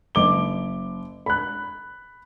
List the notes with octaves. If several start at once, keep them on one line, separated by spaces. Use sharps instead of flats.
F#1 D6 G7
B5 F#6